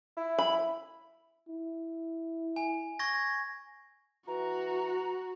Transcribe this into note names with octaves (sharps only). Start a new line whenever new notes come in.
E4
B5
E4
G#5
C#6 G#6 A#6
E3 F#4 A#5